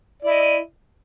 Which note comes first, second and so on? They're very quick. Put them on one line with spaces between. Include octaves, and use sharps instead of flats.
D5 E4 D#5